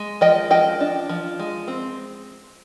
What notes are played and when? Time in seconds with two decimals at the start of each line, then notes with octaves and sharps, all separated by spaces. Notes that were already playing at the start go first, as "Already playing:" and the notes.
Already playing: G#3
0.21 F3 D#5 G5
0.50 F3 D#5 G5
0.80 D4
1.09 F3
1.40 G#3
1.68 C4